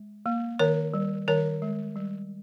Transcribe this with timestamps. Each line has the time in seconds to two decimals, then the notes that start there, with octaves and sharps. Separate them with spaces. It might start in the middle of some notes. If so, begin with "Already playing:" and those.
Already playing: G#3
0.26 A#3
0.59 D#3 A#4 C#5
0.94 G3
1.28 D#3 A#4 C#5
1.62 G#3
1.96 G3